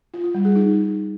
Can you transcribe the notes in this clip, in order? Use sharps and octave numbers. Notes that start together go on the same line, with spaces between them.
F4
F4
G3
G#4
D#4